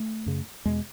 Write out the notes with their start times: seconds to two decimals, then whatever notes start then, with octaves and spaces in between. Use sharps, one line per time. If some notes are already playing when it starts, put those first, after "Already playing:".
Already playing: A3
0.26 F#2 C#3
0.65 E2 B2 G#3